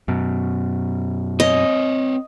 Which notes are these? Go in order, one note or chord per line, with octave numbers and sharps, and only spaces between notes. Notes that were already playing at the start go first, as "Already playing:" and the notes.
F#2 B2
C4 C#5 D#5